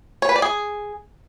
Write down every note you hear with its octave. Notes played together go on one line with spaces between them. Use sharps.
C#5
B4
D5
G#4